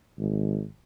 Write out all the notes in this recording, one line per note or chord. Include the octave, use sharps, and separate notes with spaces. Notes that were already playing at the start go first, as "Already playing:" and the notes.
G#1